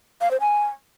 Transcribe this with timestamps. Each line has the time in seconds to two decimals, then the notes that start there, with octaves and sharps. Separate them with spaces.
0.21 F5
0.31 C5
0.40 G#5